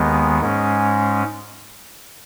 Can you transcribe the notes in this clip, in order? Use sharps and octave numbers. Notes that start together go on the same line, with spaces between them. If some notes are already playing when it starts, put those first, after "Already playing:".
Already playing: D#2 D#3 G#3 B3
G#2 G#3 C#4